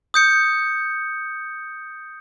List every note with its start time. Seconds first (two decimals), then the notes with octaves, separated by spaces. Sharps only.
0.14 D#6 G6 C#7